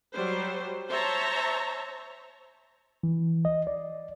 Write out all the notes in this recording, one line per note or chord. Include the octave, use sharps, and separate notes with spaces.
F#3 G3 C5
C5 C#5 E5 A5 A#5
E3
D#5
D5